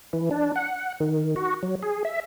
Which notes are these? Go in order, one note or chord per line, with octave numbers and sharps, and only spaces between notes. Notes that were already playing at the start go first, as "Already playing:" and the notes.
E3
D4
F#5
D#3
F#4
F#3
G#4
E5